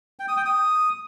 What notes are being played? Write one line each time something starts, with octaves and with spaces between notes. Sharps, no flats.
G5
D#6
G5
D#6